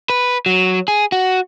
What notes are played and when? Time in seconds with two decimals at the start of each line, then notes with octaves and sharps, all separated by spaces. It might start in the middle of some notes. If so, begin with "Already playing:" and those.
0.10 B4
0.46 F#3
0.88 G#4
1.12 F#4